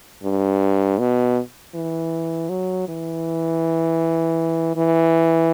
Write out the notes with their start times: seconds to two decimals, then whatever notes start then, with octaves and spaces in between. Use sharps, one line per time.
0.23 G2
1.00 B2
1.75 E3
2.49 F#3
2.88 E3
4.76 E3